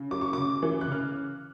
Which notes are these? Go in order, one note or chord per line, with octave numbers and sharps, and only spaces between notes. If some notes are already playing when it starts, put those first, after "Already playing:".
Already playing: C#3
F#3 D6
C#6
C#3 D6
E3
F#6
C#3 F6